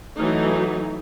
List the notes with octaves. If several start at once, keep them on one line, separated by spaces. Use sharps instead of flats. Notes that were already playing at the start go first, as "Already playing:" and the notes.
E3 F#3 A3 D#4